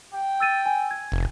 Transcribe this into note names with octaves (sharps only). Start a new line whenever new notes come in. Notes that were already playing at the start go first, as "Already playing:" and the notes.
G5
E6 A6 D#7
G#5
G#6
F1